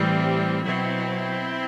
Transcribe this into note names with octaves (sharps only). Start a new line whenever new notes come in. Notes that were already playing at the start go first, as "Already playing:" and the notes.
Already playing: A2 E3 G3 C4
B2 F#3 C4 E4